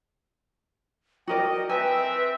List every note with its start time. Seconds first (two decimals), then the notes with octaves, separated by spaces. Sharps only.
1.28 F#4 A#4 D5 D#5 G5
1.69 C4 B4 E5 G#5